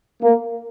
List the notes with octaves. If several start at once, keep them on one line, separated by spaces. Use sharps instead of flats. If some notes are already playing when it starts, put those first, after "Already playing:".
A#3